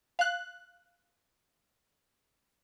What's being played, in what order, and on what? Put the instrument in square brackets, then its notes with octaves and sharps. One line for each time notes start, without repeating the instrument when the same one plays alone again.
[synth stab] F5 F#6